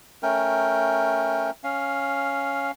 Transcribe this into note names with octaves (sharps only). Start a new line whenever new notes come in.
A3 C#4 A#4 G5
C#4 F5